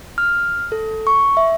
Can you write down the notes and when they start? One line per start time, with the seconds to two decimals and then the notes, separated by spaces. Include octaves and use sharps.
0.18 F6
0.72 A4
1.07 C#6
1.37 E5